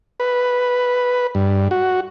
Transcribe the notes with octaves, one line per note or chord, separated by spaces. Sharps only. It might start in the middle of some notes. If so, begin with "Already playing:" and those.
B4
G2
F#4